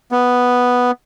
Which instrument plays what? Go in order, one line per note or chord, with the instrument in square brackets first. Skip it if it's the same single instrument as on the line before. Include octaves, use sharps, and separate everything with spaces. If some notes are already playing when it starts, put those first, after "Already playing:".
[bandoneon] B3